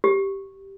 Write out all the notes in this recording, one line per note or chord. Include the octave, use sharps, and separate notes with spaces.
G4